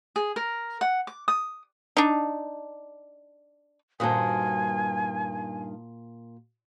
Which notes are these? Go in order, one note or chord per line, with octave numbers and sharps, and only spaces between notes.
G#4
A#4
F#5
D6
D#6
D4 D#4
G2 A#2 D#3 F#4 C5 G#5 A5 D#6